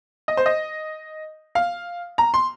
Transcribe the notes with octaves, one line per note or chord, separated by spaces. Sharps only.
D#5
C5
D#5
F5
A#5
C6